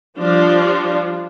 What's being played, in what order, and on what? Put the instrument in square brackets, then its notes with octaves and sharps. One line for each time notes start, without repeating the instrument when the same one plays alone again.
[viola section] F3 G3 D4 F4